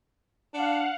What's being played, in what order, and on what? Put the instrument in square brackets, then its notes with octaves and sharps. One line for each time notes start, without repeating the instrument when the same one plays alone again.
[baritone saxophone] D4 [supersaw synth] F5 F#5